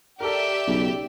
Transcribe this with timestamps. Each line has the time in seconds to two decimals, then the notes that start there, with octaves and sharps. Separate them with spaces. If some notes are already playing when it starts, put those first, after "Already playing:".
0.20 G4 A4 A#4 D5 E5
0.67 B1 C#3